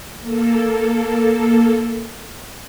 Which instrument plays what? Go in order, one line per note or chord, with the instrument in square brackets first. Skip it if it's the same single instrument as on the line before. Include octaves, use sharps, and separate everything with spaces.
[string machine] A#3 A4